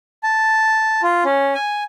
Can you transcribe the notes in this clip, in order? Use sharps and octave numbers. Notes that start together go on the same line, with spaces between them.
A5
F4
C#4
G#5